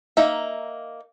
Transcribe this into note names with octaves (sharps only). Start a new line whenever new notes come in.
A#3 D#4 E5